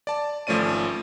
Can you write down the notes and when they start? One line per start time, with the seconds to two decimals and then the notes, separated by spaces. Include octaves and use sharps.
0.07 D5 A5
0.47 G#1 F3 A3 C#4 D5 D#7